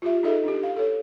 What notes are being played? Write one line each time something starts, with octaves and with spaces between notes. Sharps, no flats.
F4 G4 E5
D#4 G#4 A4 D#5 E5
D4 G4
F5
A4 C#5